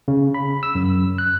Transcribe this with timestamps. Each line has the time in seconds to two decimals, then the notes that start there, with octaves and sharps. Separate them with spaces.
0.08 C#3
0.34 B5
0.63 E6
0.75 F#2
1.18 F#6